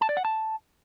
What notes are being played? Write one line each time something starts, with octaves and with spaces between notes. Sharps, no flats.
A5
D5
F#5
A5